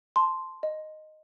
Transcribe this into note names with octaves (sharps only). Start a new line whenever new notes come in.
A5 C6
D#5